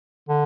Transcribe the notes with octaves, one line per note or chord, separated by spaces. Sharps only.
D3